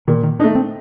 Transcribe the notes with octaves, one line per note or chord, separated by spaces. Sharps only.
A#2 D#3
D#3
A3 D4 D#4
C4